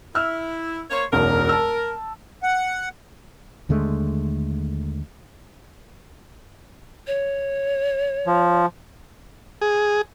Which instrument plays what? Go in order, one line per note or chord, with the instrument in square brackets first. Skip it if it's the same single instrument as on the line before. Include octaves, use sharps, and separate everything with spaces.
[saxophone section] E4 [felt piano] E6 F6
[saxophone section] A#3 C5 C#5
[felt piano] E1 B1 F#2 [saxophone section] A#4
[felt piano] A5 E6
[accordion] F#5
[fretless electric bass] D#2 D3 G#3 A3
[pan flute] C#5
[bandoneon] F3
[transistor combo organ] G#4